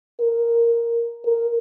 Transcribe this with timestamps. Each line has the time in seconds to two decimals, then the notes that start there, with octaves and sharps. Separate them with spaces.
0.21 A#4
1.25 A#4